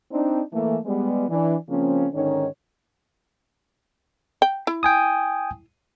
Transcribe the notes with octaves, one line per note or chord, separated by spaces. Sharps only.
C4 D4 D#4
E3 A3 A#3
G3 G#3 B3
E3 D4
C#3 F3 A#3 C4 C#4
G#2 D3 D#3 C#4 D#4 C#5
G5
E4
G5 G#5 D#6